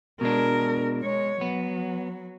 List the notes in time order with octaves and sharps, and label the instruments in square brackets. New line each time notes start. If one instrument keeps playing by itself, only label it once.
[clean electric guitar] B2 G#3 D4 [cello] A#4
[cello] G#3 C#5
[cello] F#3 [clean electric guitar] B3